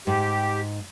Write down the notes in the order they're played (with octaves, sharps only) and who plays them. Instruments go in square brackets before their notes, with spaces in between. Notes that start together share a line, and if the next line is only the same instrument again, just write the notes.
[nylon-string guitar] G#2 [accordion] G4